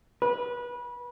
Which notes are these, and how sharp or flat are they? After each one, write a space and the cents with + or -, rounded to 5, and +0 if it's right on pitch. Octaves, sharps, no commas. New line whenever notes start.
B4 -25